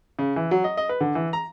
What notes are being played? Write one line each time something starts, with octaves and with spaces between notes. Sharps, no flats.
C#3
E3
F#3
D#5
D#5
B4
D3
E3
A#5